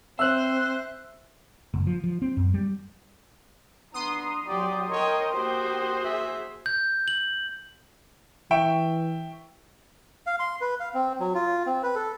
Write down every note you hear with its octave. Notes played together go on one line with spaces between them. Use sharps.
C4 C5 E5 E6 F#6
F#1
F3
F3
C4
F#2
G3
B3 D4 A#5 C6 D#6
F#3 G4 D5
A#4 C#5 D#5 G5
A#3 F#4 G4 C5 G5
G#4 E5
G6
F#7
E3 E5 G5 C#6
F5
C6
B4
F5
C4
F#3
F4
C4
B4
A4